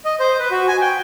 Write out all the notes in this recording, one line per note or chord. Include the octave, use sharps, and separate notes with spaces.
D#5
C5
B4
F#4
G#5
G5